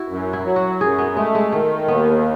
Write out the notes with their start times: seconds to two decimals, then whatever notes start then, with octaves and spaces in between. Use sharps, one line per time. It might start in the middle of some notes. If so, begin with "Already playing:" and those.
Already playing: E4 F#4
0.08 F#2
0.33 E4
0.45 F#3
0.56 F#4
0.80 F#2 G#4
0.98 B3
1.16 G#3 A3
1.35 G#3
1.52 D#3 A3
1.88 D#2 B3